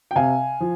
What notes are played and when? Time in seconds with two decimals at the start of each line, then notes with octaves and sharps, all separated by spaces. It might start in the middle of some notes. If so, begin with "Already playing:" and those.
0.11 G5
0.16 C3 F5 G#5
0.61 F3